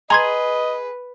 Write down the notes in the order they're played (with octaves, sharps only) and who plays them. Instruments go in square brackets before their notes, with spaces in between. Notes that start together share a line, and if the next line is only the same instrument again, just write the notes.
[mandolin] G#4 [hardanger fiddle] B4 [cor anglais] D#5 [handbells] A#5 C6 G#6